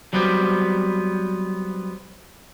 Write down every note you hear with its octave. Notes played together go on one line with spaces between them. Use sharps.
F#3 G3 B3 C4 G4